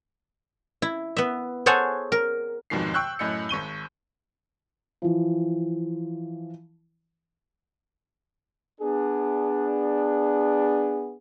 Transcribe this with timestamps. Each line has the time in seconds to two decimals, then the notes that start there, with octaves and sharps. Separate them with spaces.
0.82 E4
1.16 B3 E5
1.66 G#4 A4 C5 C#5 F#5 G#5
2.12 A#4
2.70 D#1 F2 G#2 B2 D#3 C7
2.94 G5 C#6 E6 F#6 G6
3.19 F#2 A2 D#5 G6 C#7
3.49 G#1 C#6 D#7 G7
5.02 E3 F3
8.81 B3 D4 G#4